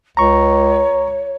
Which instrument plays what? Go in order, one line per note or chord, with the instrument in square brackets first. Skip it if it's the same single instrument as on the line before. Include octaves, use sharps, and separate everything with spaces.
[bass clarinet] C#2 [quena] C#5 [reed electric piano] A#5 C#6